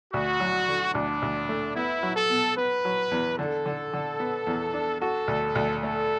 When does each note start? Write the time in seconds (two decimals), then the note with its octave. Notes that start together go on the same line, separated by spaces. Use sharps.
0.13 D2 F#4
0.40 F#3
0.68 D3
0.95 D2 D4
1.22 D2
1.49 A3
1.76 B3 E4
2.03 F#3
2.16 A4
2.30 B2
2.57 B3 B4
2.85 F#3
3.11 E2
3.38 D3 A4
3.66 D3
3.93 D3
4.20 B3
4.47 E2
4.74 D4
5.01 F#4 A4
5.28 D2
5.55 D2
5.82 A3 A4